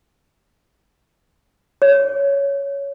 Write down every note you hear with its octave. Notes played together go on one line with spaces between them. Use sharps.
C#5